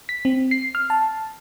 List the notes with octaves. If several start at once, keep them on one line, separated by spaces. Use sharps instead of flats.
B6
C4
C7
F6
A5